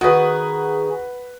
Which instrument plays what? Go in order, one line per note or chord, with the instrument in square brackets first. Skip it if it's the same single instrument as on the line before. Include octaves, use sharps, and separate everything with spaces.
[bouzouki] D#3 G#4 [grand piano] F#4 [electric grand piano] B4 F#5